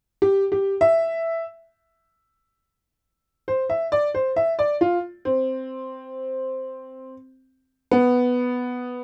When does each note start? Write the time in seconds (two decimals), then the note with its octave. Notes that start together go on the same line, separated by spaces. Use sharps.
0.22 G4
0.52 G4
0.81 E5
3.48 C5
3.70 E5
3.92 D5
4.15 C5
4.36 E5
4.59 D5
4.81 F4
5.25 C4
7.91 B3